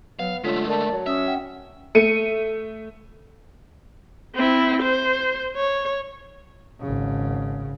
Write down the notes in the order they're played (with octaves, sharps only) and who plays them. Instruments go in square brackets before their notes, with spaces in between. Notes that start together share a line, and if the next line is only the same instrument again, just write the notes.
[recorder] F#3 [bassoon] B3 [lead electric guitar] F5
[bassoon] D3 [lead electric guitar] G#3 A3 [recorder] F4 [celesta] C#5 B6
[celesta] A#4 A5 [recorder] D5
[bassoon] F#3
[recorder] C#4 [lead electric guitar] E5 [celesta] D#6 E6
[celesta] F#5 G5
[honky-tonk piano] A3 C#7 D#7
[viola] C4 E4
C5
C#5
[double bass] G#1 C#3